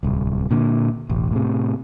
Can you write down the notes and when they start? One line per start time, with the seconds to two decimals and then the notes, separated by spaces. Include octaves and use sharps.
0.03 D1 C2
0.51 A#2 D3
1.09 E1 A1
1.31 A2 C3